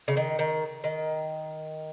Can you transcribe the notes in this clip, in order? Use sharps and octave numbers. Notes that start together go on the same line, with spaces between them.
C#3
D#3
D#3
D#3